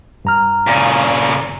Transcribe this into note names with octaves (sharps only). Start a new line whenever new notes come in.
G2 A#5 F6
A#2 C#3